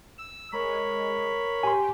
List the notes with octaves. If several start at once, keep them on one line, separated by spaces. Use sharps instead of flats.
E6
G#3 A#4 C#5 B5
G4 G#5 C6